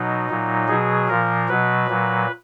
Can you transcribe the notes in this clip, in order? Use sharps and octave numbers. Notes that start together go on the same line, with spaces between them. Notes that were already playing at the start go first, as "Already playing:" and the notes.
Already playing: B2 F#3 D#4
A#2 F#3
B2 F#3 G#4
A#2 F3 A#4
B2 F#3 B4
A#2 F#3